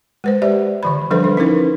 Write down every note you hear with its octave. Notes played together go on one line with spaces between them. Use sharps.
G#3 B4 C5
G4 D5 E5
D3 E3 B5
F3 G3 D4 A4 B4 C5
D4
C#4 D#4 E4 A#4 B4